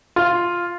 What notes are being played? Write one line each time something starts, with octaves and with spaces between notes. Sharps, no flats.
F4